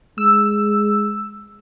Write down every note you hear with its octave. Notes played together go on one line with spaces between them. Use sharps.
G#3 E6